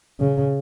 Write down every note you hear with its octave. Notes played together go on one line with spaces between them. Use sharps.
C#3